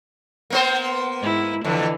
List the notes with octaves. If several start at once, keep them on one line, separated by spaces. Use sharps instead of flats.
A#3 B3 C5
G#2 E4
F2 D3 E3